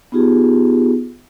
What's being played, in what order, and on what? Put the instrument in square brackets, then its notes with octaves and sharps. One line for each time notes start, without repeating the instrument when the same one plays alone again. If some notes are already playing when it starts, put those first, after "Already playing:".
[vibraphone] B3 D#4 F4 G4 G#4